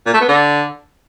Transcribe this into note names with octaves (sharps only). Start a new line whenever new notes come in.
A#2
A3
B3
D3